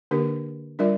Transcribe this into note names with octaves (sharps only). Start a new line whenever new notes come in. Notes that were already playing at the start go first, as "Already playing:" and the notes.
D3 A#3 D4 G4 A#4
G3 D4 F4 A#4 D5